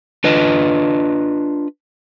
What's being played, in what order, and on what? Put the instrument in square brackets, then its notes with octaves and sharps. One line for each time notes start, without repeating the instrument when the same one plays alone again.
[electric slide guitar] D4 F4 B4 D#5